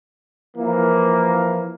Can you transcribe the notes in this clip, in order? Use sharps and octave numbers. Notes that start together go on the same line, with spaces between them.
E3 F3 A#3